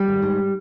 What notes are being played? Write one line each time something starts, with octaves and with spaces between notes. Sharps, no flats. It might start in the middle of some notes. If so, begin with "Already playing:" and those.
Already playing: G3
G#1
G#2